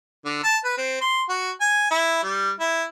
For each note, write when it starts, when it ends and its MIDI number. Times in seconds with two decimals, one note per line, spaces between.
0.25 0.40 50
0.43 0.58 81
0.64 0.77 71
0.78 1.00 60
1.01 1.22 84
1.29 1.51 66
1.61 1.89 80
1.90 2.23 64
2.24 2.50 55
2.60 2.84 64